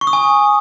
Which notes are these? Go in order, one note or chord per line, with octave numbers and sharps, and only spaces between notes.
C#6
D#6
G#5